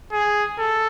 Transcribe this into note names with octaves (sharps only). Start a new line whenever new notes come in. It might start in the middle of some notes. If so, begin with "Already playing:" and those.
G#4
A4